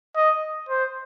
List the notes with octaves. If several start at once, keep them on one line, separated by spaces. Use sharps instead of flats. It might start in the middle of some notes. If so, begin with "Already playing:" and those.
D#5
C5